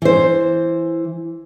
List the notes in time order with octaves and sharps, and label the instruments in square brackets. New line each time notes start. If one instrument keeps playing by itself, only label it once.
[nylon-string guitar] E3 C5